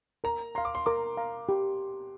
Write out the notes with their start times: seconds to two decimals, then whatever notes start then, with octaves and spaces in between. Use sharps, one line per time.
0.24 A#4 A#5
0.55 F5 A#5 C6
0.65 D6
0.75 C6
0.86 A#4 D6
1.17 F5 A#5
1.49 G4